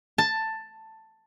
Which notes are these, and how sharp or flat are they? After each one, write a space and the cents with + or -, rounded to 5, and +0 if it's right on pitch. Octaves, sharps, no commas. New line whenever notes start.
A5 +10